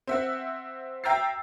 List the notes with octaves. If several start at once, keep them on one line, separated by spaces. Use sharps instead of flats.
C4 E5 F#5
E5 G5 A#5 E6 A6 C7